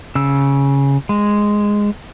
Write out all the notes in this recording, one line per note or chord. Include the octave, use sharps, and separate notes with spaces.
C#3 E6
G#3